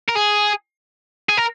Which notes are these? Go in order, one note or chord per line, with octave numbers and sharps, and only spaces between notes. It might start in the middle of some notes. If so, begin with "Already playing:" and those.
A#4
G#4
G#4
A#4